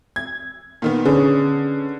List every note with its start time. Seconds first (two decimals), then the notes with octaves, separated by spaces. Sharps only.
0.16 G#6
0.82 A#2 D#3 B3
1.05 D3 C#4 G#4 B4